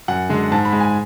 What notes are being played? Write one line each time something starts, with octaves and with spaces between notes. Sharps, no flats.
F#2 F#5
D3 G#3
G#2 A5
B5
G#3
G#5